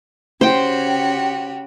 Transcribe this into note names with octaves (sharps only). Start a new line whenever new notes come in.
C#3 F#4 G4 C5 G5